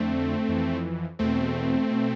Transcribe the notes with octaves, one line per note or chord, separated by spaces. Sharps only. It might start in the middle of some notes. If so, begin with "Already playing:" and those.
Already playing: F2 D3 A3 C4
F2 E3
E2 B2 A3 C4
B2